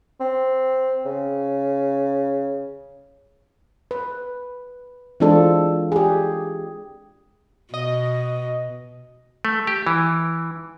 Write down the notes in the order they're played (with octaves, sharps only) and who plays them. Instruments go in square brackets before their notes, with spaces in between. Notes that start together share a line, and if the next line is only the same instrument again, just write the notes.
[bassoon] C4
C#3
[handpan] B4
E3 G#3 C4 D4 F4 A4
G4 G#4
[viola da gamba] B2 [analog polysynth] D#5
[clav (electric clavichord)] A3
G4
E3